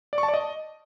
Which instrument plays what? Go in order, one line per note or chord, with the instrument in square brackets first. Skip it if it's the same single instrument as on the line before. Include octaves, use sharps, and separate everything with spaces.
[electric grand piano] D5
C#6
A5
D5
D#5